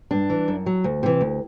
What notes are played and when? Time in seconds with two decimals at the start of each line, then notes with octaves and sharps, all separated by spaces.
0.11 G2 D4
0.30 E3
0.48 F#2
0.66 F#3
0.84 D2
1.03 C3 E3
1.21 D2